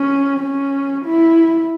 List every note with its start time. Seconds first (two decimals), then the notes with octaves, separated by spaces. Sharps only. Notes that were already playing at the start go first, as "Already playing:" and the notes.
Already playing: C#4
0.40 C#4
1.05 E4